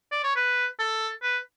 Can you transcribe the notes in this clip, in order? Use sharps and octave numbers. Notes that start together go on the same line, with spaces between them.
D5
C#5
B4
A4
B4